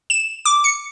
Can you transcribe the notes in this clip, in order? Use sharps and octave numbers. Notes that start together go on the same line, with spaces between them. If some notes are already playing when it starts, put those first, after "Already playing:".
E7
D6
C#7